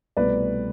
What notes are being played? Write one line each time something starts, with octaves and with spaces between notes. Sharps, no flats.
C2 B2 A3 B4 D5